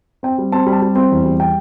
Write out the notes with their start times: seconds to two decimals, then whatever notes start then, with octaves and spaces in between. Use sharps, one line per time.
0.23 C4 G5
0.38 G3
0.52 C4 A5
0.66 G3
0.72 A5
0.82 G3
0.96 C4
1.10 E2
1.25 G3
1.40 G5